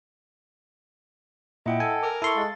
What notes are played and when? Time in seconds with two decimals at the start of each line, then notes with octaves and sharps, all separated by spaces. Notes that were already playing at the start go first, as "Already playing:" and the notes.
1.66 A#2 E4 D#5 F#5 G5
1.80 A4 G#5
2.03 A#4 D6
2.22 E4 A4 C6 C#6
2.37 G#3 F5 A6